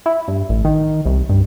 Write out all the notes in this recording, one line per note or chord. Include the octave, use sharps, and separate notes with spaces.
E4
G2
A1
D#3
C2
G2